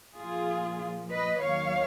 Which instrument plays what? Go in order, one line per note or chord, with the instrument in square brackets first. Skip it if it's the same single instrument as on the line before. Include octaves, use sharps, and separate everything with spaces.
[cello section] A#2 F3 F4 G#4
B4 D#5
D#2 D#3 F#3 C#5 F5